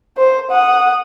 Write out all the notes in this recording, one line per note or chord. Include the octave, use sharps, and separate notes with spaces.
C5
F#5 D#6